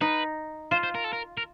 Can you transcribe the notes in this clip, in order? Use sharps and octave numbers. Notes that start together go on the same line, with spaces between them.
D#4 B4
F4 C5
C5
A#4
A4
A#4
A#4